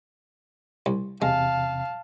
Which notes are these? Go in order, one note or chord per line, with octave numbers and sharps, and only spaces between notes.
C2
E2 C3 G#3 F5 A5